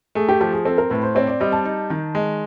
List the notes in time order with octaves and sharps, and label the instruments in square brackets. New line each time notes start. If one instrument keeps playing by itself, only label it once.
[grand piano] A3 [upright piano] G#4
[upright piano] G4
[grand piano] F3 [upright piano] G4
[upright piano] G#4
[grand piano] C4 [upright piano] A4
[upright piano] A#4
[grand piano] A2 [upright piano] B4
[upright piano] C5
[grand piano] C4 [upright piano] C#5
[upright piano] D5
[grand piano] G3 [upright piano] D#5
[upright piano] A5
[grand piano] D#4
D#3
G#3